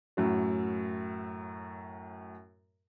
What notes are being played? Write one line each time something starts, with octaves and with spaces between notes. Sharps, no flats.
F#2 A2 F#3